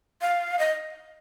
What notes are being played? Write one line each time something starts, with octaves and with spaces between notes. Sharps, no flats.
F5
D#5